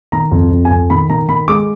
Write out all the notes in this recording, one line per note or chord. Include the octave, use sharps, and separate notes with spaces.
D#3 A#5
F2
F2
G#5
F2
D#3 B5
D#3 A#5
D#3 B5
G#3 D6